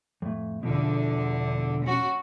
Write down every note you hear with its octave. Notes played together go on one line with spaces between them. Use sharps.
F2 A2
E2 B2 D3 F3
C#4 F#4